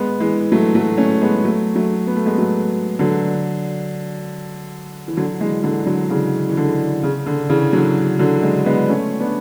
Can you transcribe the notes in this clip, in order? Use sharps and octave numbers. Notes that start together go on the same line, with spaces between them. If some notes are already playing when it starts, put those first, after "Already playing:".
Already playing: G#3 B3
E3 G#3
F#3 A3
F#3 A3
A3 C#4
G#3 B3
F#3 A3
F#3 A3
B3
A3
G#3 B3
F#3 A3
D3 F#3
E3
D3 F#3
E3 G#3
D3 F#3
D3 F#3
C#3 E3
E3
D3
C#3
D3
C#3 E3
D3 F#3
D3 F#3
E3 G#3
G#3 B3
A3 C#4
B3 D4